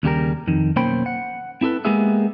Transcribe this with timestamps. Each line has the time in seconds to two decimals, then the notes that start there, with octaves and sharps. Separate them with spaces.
0.03 D#2 C#3 G3 G4 A#4
0.47 F2 D#3
0.76 B1 A#3 C#4 C5 G5 B5
1.06 F#5
1.61 C4 E4 G#4 A4 B4
1.85 G#3 A#3 B3 G4 G#4 E5